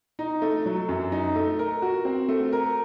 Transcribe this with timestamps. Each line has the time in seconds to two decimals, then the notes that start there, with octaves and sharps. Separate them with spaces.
0.19 D#4
0.42 A3
0.66 F#3
0.89 F#2
1.12 D#4
1.36 A3
1.59 A#4
1.82 F#4
2.05 C4
2.29 A3
2.53 A#4